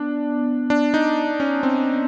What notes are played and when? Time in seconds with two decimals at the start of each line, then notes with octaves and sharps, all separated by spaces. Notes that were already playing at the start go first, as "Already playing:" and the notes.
Already playing: B3 D4
0.70 D4
0.94 D#4
1.40 C#4
1.63 C4